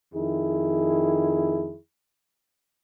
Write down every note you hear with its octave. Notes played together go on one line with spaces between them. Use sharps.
F2 D#3 E4 G#4